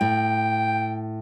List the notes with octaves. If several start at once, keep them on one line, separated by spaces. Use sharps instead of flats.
A2 G5